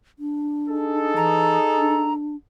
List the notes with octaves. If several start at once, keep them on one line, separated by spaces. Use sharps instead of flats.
D4
D#4 G#4 A4
E3 A#5
D4